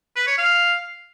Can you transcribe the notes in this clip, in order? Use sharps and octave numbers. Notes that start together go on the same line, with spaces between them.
B4
C#5
F5